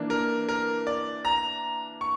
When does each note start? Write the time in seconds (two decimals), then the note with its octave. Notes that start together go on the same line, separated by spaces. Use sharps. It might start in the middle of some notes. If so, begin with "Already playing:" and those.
Already playing: E3 A#3 D4
0.10 A#4
0.49 A#4
0.87 D5
1.25 A#5
2.01 C#6